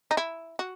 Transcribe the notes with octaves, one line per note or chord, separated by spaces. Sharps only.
D#4
E4
F#4